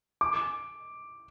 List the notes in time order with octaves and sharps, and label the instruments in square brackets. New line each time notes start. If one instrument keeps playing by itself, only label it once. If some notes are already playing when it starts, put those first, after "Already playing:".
[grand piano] D6